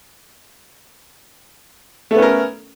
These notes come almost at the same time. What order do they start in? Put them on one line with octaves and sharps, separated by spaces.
A3 B3 C#4 A#4